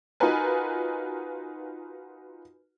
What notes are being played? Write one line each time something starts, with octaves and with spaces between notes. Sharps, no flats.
D#4 F4 F#4 A#4 B4 G#5